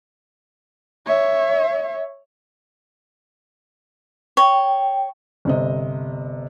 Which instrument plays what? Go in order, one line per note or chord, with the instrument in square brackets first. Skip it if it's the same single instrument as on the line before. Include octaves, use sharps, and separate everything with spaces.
[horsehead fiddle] C#5 E5
[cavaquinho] C#5 [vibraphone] G5
[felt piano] G1 C3 D#5